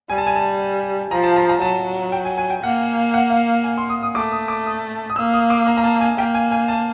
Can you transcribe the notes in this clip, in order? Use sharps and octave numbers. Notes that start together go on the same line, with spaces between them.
G3 G#5
A5
G#5
A5
F3 A#5
A5
A#5
A#5
F#3 A5
G5
G#5
G#5
G5
A#3 F#5
F#5
F5
G#5
C6
D#6
D#6
A3 D6
D#6
D6
D#6
D#6
A#3 E6
D#6
D6
A#5
A#5
A5
G#5
A#3 G5
G#5
G#5
A5